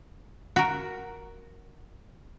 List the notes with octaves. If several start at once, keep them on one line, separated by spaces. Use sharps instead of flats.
F#4 A#4